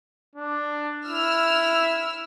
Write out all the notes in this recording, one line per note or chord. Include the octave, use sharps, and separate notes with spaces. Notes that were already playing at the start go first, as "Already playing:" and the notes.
D4
E4 E6 F6